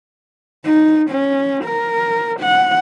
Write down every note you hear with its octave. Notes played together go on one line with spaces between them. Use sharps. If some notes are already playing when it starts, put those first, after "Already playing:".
D#4
C#4
A#4
F#5